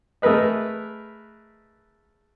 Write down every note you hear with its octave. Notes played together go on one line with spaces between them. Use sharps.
A3 G#4 A#4 B4 D#5